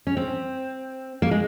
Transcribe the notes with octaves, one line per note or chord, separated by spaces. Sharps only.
C#4
C4
A#3
G#3